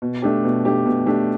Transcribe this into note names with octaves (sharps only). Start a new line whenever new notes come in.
B2
A3 D4 G4
B2
A3 D4 G4
B2
A3 D4 G4